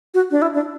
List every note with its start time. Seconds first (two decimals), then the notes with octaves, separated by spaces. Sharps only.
0.14 F#4
0.31 D4
0.42 E4
0.55 D4